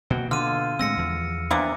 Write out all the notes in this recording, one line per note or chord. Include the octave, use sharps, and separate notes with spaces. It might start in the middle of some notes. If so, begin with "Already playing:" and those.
B2 A#3 F#4 G5
D3 F4 F6 D#7
A2 G#3 C4 E6 A#6 C#7
E2 F3
C3 E3 A#3 B3 D4 D6